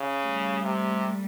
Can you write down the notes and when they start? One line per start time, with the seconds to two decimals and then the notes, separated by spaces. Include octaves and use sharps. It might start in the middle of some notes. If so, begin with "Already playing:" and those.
Already playing: C#3
0.23 G3 A3
0.63 C3